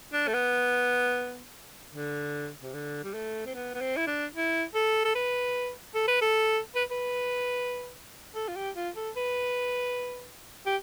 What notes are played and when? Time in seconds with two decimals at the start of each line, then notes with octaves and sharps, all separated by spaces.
0.13 D4
0.28 A3
0.34 B3
1.94 D3
2.62 C3
2.74 D3
3.04 G3
3.14 A3
3.46 C4
3.55 B3
3.74 B3
3.81 C4
3.97 E4
4.07 D4
4.35 E4
4.75 A4
5.05 A4
5.15 B4
5.95 A4
6.08 B4
6.21 A4
6.75 B4
6.91 B4
8.35 A4
8.48 F4
8.56 G4
8.75 F4
8.96 A4
9.16 B4
10.66 G4